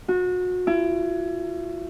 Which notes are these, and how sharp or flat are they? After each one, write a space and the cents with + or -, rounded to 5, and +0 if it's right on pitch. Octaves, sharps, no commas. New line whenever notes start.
F#4 -30
E4 +35